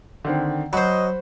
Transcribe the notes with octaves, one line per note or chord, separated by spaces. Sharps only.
D3 D#3 C4
F#3 F#4 C5 D#5 B5